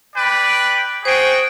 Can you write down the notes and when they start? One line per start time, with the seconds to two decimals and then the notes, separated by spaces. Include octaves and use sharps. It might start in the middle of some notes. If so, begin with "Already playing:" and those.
0.15 B4 D5 G5
1.05 F#4 G#4 C5 G5